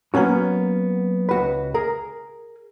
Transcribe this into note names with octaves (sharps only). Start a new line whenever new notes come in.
F#3 A#3 B3 C#4 F#4
C#2 F#4 B4
G#4 A#4